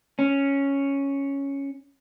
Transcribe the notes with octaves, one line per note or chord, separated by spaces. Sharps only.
C#4